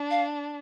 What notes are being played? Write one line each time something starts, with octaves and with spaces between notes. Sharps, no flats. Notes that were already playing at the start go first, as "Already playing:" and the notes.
Already playing: D4
F5